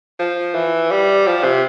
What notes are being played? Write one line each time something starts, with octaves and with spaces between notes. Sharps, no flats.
F3
E3
G3
F3
C3